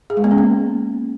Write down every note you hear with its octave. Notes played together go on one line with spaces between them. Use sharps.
G#4
G#3
B3
C#4
A#3